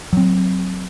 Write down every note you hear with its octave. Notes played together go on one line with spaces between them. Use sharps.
F#3 C4